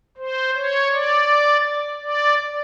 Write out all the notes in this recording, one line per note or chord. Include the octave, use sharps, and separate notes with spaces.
C5
C#5
D5
D5